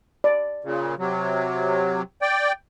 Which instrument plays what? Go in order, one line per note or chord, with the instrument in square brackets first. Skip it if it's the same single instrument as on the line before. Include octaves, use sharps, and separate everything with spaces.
[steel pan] D5
[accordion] A#2 C#3
C3 F#3
D5 G5